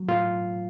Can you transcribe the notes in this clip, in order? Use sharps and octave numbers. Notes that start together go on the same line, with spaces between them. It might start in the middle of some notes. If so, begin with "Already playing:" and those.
Already playing: F#3
A2 F4